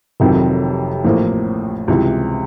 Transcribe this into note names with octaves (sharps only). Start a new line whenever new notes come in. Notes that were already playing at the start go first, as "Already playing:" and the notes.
F1 F2 C3 D#3 F#3
A1 A2 F3 A#3
C#2 C3 E3 G3